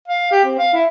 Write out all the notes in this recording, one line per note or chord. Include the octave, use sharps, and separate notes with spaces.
F5
G4
C4
F5
E4